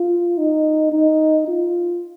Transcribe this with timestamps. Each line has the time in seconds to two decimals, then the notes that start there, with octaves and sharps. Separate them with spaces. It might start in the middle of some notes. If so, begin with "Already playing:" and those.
Already playing: F4
0.37 D#4
0.92 D#4
1.48 F4